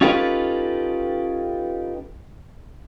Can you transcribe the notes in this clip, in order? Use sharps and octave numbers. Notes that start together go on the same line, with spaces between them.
C#4 D#4 F4 G4 A4 B4